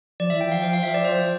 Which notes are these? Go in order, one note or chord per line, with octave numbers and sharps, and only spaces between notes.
F3 D5
E3 E5
F3 G5
F5
G5
F5
E5
D5
C5